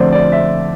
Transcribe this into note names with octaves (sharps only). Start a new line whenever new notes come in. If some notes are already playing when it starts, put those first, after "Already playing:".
Already playing: F2 D3 A3 C4 C5 D5
D5
E5